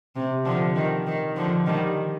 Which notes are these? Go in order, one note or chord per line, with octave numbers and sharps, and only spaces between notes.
C3
D3 F3
D#3
D#3
D3 F3
D#3 G3